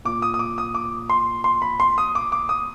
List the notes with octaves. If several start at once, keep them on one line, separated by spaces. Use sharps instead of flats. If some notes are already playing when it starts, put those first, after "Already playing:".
A#2 D6
D#6
D#6
D6
D#6
D6
C6
C6
B5
C6
D#6
D6
D6
D#6